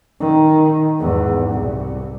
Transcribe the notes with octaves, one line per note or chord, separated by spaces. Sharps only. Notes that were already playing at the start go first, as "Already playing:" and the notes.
D#3
E2 G#2
C2